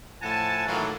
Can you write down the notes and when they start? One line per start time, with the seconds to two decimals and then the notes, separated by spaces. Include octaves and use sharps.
0.22 A2 F3 F#5 G#5 A5
0.68 A2 D#3 E3 F#3 A#3 F4